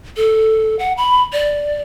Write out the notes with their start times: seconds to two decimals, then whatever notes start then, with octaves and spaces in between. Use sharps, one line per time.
0.17 A4
0.79 F#5
0.97 B5
1.33 D5